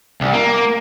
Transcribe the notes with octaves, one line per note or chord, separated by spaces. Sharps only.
C2
A#3